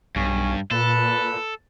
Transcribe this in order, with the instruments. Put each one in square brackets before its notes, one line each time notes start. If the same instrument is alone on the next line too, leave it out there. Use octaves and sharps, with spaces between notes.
[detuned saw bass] B1 [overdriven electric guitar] G2 [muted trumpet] C#4
[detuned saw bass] A#2 [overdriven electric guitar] A4 [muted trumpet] B4